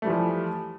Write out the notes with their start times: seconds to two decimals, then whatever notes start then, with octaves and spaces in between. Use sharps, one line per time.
0.02 A3
0.05 G3
0.07 E3
0.10 F3